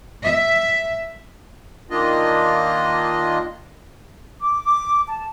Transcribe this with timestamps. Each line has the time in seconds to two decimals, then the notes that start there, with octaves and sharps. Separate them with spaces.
0.24 E5
1.90 D#3 A#3 D4 F4 D#5
4.40 D6
4.64 D6
5.07 A5